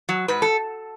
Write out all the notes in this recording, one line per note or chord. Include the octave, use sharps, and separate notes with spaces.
F#3
G#2 B4
A4